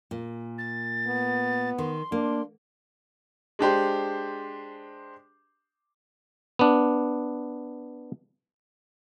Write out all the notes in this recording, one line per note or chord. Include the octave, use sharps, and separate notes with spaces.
A#2
A6
B3
D#3 C6
A#3 D4
G#3 D4 G4 C5
B3 D4